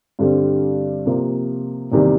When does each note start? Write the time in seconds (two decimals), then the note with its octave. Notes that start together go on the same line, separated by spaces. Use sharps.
0.19 G2 D3 G3 C4
1.06 C3 F3 A#3
1.92 E2 C3 D#3 G3 A#3